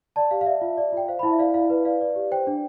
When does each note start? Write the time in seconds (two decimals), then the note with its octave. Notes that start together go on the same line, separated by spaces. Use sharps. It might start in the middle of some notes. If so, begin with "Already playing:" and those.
0.16 D5 A5
0.31 G4 F5
0.41 F5
0.46 D5 E5
0.62 F4
0.77 D5
0.92 F4 G5
1.08 C5 F5
1.19 B5
1.23 E4 A5
1.32 E5
1.39 D5 F5
1.54 E4 F5
1.70 B4
1.85 D5 F5
2.01 D5
2.16 G4
2.31 C5 G5
2.47 D4